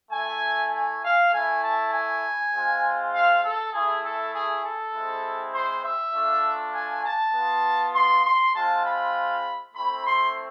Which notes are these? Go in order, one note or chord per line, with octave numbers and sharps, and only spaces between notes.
A3 E4 G#5
G#5
F5
A3 E4 G#5
A5
G#5
G#3 C4 F4
F5
A4
A3 E4 G#4
A4
G#4
A4
G#3 C4 E4
C5
E5
A3 D4 F4
G#5
A5
B3 F4
C6
C6
G#3 C4 F4 A5
B5
A3 C4 E4 B5
C6